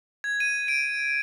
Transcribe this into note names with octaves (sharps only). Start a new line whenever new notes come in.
G#6
D#7
D7